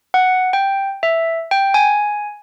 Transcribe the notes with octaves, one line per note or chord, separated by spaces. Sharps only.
F#5
G5
E5
G5
G#5